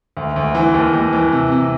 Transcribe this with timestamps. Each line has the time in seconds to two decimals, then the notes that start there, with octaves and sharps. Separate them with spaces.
0.17 D2
0.36 D2
0.55 E3
0.74 D#2
0.93 D#2
1.13 E3
1.32 C3
1.52 C3